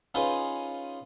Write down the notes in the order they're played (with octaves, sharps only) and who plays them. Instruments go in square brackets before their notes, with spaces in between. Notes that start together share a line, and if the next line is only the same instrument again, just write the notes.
[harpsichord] C#4 D#4 F4 G#4 B4 C5